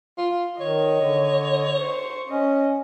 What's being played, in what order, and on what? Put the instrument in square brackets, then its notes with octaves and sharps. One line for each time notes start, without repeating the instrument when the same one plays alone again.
[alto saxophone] F4
[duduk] D#3 [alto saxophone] C#5 [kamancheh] D#5
[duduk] D3
[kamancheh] C5 C#6
[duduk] C#4 [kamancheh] D#5